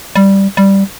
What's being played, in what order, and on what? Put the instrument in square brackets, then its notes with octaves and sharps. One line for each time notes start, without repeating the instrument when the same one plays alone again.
[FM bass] G3
G3